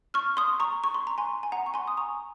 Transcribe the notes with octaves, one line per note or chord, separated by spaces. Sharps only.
C#6 F6
C6 D#6
A#5 C#6
C#6
C6
A#5
G#5 C6
G#5
F#5 A#5
C#6
G#5 C6
D#6
A#5 C#6